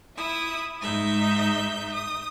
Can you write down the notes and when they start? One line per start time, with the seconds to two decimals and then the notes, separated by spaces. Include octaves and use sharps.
0.17 E4 E5 D#6
0.82 G#2 D#4 E5 G6
1.93 D#6